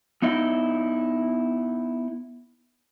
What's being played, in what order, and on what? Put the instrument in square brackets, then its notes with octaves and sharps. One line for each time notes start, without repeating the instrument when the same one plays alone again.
[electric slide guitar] B3 D#4 E4 D#5